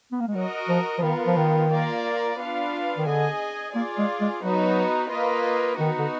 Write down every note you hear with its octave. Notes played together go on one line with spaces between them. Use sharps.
B3
A#3
G#3
F#3 F#4 A#4 D#5
F3
F3
D#3 B3 F4 A#4
F3
D#3
A#3 F4 A#4 D5
B3 D4 F4 B4 F5
D#3
D3 G#4 D#5 G#5
A#3 F4 G#4 D5
G#3
G#3
F#3 B3 D#4 F#4 B4
A#3 F4 B4 D#5
D#3 B3 D#4 F#4
D3